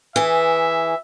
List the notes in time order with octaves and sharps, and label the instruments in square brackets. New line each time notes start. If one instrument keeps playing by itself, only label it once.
[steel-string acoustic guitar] E3 G#4 [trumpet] E5